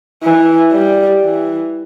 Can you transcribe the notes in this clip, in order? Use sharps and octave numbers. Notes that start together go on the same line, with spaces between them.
E3
G3
E3